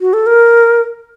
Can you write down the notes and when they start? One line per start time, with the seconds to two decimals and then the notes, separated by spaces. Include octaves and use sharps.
0.01 F#4
0.13 A4
0.27 A#4